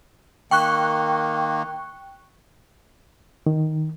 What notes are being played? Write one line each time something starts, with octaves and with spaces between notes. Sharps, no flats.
D#3 A#3 G5 C#6 F#6
D#3